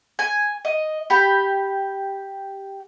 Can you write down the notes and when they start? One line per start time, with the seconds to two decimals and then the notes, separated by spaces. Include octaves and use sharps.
0.19 G#5
0.65 D#5
1.10 G4 B5